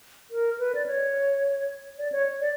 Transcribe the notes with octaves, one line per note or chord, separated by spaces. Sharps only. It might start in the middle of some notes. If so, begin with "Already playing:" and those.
A#4
B4
D5
C#5
D5
C#5
D5